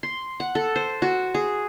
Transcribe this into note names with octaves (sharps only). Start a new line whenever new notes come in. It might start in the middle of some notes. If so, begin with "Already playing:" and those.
C6
F#5
A4
C5
F#4
G#4